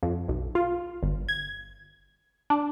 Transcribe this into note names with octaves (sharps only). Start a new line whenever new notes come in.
F2
B1
F4
G1
G#6
D4